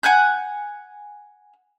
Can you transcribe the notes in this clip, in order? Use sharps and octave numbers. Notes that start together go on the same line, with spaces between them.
F#5 G#5 F#6 G6